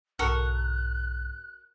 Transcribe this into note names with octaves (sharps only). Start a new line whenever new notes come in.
B1 G#2 F#4 A4 A#4 F#6